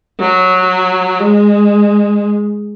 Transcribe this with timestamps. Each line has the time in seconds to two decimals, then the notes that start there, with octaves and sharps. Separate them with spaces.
0.20 F#3
1.19 G#3